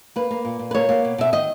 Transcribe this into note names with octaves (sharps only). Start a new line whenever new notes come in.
A#3 B4
A#3
A#2
A#2
B4
A#3 C#5
A#3
B2
B2 E5
D#3 D#5